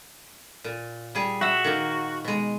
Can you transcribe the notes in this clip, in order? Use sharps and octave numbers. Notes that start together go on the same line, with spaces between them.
A#2
G3 G#4
F#4 E5 F#5
D#3 A#3
B2 G#3